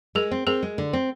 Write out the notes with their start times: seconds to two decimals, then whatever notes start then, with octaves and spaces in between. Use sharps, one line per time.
0.15 G#3 G#4 A#4
0.31 C4
0.47 C4 G#4 A#4
0.63 G#3
0.78 D3
0.93 C4